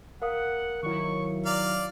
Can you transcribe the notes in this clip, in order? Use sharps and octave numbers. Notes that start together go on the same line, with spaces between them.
A#4 F5 F#5 D#6
D#3 F#3 E4 C#6
D5 F5 A#5